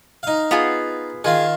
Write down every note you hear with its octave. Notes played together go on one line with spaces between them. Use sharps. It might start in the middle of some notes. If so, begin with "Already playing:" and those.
D#4 F5
B3 F4 G#4
D#3 F4 G#4 F5